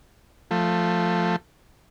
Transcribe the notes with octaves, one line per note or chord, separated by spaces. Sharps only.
F3 A3